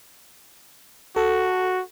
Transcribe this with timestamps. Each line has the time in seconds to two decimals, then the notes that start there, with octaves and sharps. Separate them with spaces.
1.16 F#4 A4